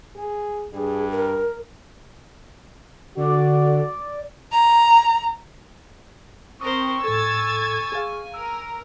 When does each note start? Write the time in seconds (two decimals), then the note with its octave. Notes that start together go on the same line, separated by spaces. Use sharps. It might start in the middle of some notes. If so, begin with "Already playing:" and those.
0.16 G#4
0.73 G2 G#4
1.12 A#4
3.17 D3 F#4 D5
4.52 A#5
6.61 C4 A#4 C5 C#6 D#6
7.04 A2 A4 G#5 E6 G#6 A6
7.92 G#4 F5
8.34 A#4 E6